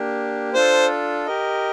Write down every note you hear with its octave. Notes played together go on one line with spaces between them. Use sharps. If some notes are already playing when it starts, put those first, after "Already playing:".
Already playing: A#3 D4 G4
D4 F4 A4 C5
G4 A#4 D#5